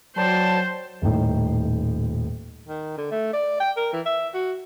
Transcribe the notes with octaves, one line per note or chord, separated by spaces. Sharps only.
F#3 C5 D5 G5 A5
D#1 A2 D#4 G5
D#3
D3
A3
D5
G5
A#4
E3
E5
F#4